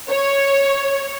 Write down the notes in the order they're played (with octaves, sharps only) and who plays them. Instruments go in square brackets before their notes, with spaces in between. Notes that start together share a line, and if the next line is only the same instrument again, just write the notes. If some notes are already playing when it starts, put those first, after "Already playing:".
[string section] C#5